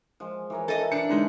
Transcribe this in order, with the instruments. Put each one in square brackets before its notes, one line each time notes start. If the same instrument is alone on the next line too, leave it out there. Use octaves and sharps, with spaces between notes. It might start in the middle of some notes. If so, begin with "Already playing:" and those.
[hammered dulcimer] F3 G#3
E3 A#4 C#5
[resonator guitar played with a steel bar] A4 D#5
[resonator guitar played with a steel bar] D4 [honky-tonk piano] C#7
[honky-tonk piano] D3 G#3 D#4 [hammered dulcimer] B4